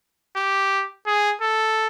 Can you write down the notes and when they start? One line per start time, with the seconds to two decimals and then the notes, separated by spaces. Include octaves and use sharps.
0.36 G4
1.06 G#4
1.42 A4